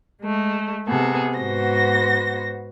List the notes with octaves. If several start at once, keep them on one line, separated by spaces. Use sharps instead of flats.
G#3 A3
C3 B3 G#4 A4
G#2 B3 F#4 C5 A#6